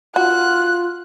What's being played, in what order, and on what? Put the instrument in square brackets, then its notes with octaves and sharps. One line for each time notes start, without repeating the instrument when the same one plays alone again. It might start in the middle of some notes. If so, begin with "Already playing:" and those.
[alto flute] F4 [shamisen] F#4 [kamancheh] F#6